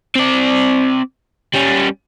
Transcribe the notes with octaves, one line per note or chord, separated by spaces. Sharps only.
C4 D5
G3 C#4